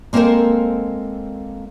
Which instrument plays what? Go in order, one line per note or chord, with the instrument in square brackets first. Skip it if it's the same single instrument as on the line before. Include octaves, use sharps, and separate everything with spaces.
[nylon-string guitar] G#3 A#3 C4 A4 A#4 C5